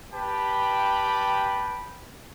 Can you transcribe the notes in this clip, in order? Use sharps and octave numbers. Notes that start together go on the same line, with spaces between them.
G4 B4 G5 A5 B5